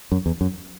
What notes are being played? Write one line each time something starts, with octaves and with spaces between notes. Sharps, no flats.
F#2
E2
F#2